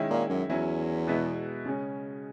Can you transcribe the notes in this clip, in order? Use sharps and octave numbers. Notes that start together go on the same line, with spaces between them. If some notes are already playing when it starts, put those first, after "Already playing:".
Already playing: D#3 G#3 C#4 E4
A#2
F#2
E2 F#3 C#4 E4
B2 G#3 B3 E4
C#3 G#3 C#4